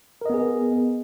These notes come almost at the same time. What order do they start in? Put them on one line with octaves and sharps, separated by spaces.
A#4 D#5 B3 G#4